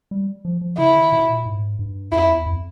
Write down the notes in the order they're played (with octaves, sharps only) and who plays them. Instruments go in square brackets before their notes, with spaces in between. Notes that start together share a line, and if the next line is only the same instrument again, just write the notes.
[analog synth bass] G3
F3
F3
[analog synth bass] C#3 [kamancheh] E4
[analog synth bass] D#3
B2
A#2
G#2
G2
[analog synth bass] F2 [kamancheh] E4
[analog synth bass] E2
F2